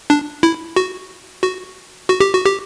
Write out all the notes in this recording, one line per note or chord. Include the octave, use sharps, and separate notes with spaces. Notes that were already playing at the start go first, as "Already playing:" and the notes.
D4
E4
F#4
F#4
F#4
G4
F#4
G4